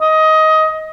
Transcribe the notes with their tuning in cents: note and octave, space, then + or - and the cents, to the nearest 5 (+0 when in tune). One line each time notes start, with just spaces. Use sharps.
D#5 +15